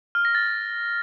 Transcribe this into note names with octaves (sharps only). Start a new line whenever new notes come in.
F6
A#6
A6